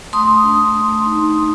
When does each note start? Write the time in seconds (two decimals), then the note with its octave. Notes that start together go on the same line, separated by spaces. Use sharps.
0.13 A3 C6 D#6
0.43 D4
0.75 A3
1.06 D#4
1.36 D#4